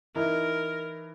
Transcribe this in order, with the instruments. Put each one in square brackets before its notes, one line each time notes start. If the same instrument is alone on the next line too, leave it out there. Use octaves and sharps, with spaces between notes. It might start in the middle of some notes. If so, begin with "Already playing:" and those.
[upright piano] E3 D#4 E4 [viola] A#4